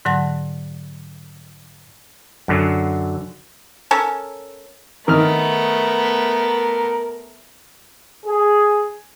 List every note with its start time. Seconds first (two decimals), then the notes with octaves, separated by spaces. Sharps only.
0.05 G#2 D3 F#3 F#5 A5 A#6
2.48 F#2 D3 F#3
3.91 C#4 A4 A#4
5.08 D#3 A3 B3 A#4 F6
8.25 G#4